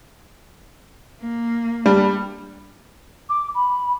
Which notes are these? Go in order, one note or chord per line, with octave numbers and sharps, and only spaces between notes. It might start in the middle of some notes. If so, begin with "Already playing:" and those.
A#3
G3 D4
D6
B5